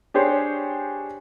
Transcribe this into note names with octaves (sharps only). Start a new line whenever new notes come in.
D4 G4 G#4 C5 C#5